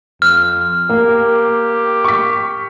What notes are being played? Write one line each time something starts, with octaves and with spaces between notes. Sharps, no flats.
F2 F6
A#3 G4
C#6 B6